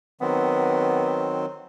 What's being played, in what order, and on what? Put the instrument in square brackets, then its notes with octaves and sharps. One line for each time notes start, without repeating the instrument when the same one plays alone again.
[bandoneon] D#3 F#3 C4 [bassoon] B3